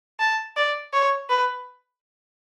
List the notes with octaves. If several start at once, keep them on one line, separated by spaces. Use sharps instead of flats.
A5
D5
C#5
B4